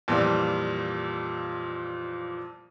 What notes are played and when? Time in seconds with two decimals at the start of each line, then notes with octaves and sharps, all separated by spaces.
0.08 F2 A#2 E3 G3